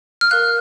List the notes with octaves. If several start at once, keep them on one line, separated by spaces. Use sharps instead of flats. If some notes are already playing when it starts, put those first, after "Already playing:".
F6
A#4 F5 F#6